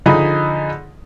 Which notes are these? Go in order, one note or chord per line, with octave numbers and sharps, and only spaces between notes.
D3 F3 D#4 G#4 D#5 B5